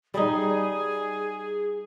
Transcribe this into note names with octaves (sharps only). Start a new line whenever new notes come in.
G3 D#4 G#4